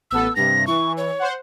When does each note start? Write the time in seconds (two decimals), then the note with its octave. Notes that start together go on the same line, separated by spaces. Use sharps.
0.11 A1 B3 A4 E6
0.36 G2 C3 A#6
0.67 E3 C#6
0.97 C#5
1.19 C5 F#5